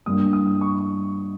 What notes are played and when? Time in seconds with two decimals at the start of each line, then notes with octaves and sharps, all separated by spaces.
0.06 G2 G3 A#3 D#6
0.33 D#6
0.61 C#6